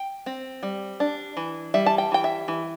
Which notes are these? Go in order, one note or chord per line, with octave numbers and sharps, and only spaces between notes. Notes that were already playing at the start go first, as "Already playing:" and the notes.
Already playing: G5
C4
G3
D4
E3
G3 E5
A5
G5
E3 G5
E5
E3